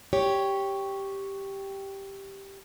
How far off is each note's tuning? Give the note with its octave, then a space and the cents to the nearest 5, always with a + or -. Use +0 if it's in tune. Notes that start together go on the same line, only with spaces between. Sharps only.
G4 +0 C#5 +0